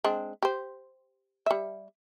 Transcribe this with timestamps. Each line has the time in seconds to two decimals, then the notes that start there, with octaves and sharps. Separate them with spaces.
0.04 G#3 C4 D4
0.42 G4 C5
1.46 G3 E5